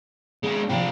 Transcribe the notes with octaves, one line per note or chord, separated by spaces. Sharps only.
G#3 D4
C3 F3 D4 F4 G5